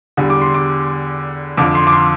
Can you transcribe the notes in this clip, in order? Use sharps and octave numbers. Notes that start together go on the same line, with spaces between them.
E2 D3 G3
D6
C6
D6
F2 D3 F3 D6
C6
D6
C6